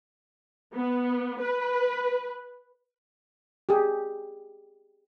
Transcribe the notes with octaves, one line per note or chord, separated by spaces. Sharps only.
B3
B4
G4 G#4